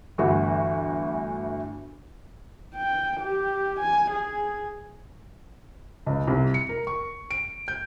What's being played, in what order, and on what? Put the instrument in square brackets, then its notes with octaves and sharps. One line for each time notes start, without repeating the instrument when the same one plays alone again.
[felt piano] G1 D2 E3 F#4 F#5
[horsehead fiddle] G5
G4
G#5
G#4
[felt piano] C#2
C2
C#7
A#4
C#6
D7
G6